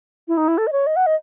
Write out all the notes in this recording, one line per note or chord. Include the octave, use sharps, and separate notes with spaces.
E4
D#4
E4
A4
D#5
C#5
D#5
F#5
D#5